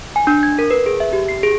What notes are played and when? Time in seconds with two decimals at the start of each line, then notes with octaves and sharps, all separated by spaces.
0.16 G#5
0.27 D4
0.43 G#6
0.59 A#4
0.71 B4
0.86 G#4
1.00 E5
1.13 G4
1.29 C7
1.43 G#4